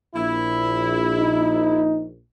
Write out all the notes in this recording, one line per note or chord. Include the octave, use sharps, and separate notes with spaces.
A#1 E4
D#4